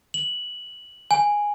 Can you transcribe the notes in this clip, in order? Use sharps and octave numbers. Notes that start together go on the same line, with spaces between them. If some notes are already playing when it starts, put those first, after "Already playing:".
F#7
G#5